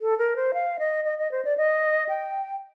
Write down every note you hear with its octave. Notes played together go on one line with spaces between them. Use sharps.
A4
A#4
C5
F5
D#5
D#5
D#5
C5
D5
D#5
G5